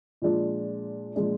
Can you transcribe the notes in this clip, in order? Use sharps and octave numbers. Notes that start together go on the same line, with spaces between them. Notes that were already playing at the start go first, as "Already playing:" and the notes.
A#2 F3 G#3 D4
A#2 F3 G#3 D4